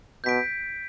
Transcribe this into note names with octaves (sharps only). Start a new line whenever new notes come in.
B2 G6 B6 D7